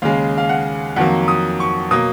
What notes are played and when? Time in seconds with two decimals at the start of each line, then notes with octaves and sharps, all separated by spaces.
0.02 D#2 C#3 G#3 F5
0.38 F5
0.49 F#5
0.96 F2 D#3 F#3 A#3 F#5
1.28 D#6
1.60 C#6
1.91 B2 F#3 A#3 D#6